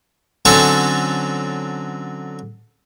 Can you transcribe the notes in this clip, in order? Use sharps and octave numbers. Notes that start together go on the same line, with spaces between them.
D3 F#3 C4 C#4 A4 C#6